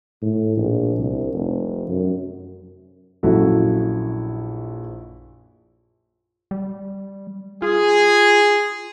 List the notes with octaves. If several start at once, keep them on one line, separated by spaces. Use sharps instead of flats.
A2
A#1
C2
F1
F#2
A#1 F#2 E4 F#4 A4
G3
F4 G#4